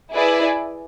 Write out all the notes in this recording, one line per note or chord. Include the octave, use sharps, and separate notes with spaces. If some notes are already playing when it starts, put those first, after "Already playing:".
E4 G#4 B4 D5